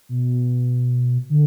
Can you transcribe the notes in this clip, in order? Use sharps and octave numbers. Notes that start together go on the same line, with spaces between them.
B2
D3